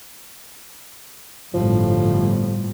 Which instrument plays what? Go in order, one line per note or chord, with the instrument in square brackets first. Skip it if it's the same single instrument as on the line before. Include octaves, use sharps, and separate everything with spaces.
[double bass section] G1 A2 G3 [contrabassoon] F3